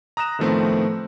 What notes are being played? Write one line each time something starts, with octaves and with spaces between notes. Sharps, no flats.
A#5 D#6 F#6 A#6 E7
A2 D#3 F3 A3 B3 C4